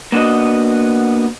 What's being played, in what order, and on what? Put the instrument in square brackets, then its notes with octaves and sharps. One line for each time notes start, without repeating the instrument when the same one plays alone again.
[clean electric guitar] A#3 B3 D4 F#4 D#5